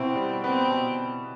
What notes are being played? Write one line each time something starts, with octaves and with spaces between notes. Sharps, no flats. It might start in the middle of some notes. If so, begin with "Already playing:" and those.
Already playing: B2 B3 C4 E4
G3
B3 C4
B2